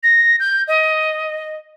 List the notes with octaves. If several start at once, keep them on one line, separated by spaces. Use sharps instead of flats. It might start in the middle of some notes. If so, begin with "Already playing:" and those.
A#6
G6
D#5